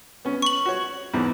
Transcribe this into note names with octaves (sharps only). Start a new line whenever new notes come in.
B3 C#4
C#6 F#7
F#4 C#5
E2 G#2 E3